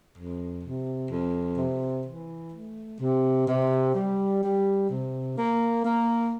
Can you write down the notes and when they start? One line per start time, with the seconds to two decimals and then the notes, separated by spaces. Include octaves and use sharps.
0.16 F2
0.63 C3
1.11 F2
1.58 C3
2.06 E3
2.52 A3
3.00 C3
3.48 C3
3.95 G3
4.43 G3
4.89 C3
5.37 A#3
5.84 A#3